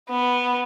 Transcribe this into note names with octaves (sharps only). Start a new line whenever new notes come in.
B3